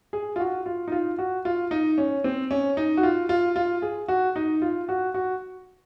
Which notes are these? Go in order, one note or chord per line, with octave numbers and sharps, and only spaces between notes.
G#4
F4
F#4
F4
D#4
F4
F#4
F4
D#4
C#4
C4
C#4
D#4
F#4
F4
F4
F4
G#4
F#4
D#4
F4
F#4
F#4